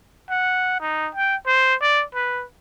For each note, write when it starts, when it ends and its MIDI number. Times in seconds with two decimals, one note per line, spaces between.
0.30 0.79 78
0.80 1.09 63
1.15 1.36 79
1.46 1.75 72
1.81 2.04 74
2.15 2.44 71